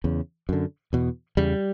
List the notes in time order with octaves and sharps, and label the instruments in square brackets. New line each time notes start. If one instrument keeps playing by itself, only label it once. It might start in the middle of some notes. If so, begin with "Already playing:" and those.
[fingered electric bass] E2 C#3
F#2 D3
E2 B2
E2 C#3 G3